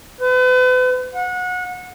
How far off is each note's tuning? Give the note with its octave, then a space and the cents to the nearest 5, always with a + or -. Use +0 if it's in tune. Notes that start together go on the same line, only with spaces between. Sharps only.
B4 +40
F#5 -25